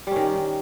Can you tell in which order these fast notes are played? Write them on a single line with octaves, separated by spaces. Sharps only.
G3 C#4 D#3